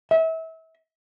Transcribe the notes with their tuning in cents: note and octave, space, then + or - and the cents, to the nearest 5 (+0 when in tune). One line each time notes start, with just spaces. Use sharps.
E5 -30